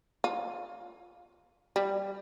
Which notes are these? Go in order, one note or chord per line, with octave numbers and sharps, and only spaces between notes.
F4
G3